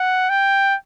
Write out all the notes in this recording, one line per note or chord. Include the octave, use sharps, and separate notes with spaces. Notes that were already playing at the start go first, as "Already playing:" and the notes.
Already playing: F#5
G5